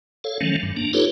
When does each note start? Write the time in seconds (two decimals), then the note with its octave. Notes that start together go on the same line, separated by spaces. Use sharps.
0.24 A4 C#5 F5
0.41 D#3 F3 F#3 A3 C#4
0.63 G2
0.77 A#3 D4
0.93 D#4 F4 G4 A4 B4 C#5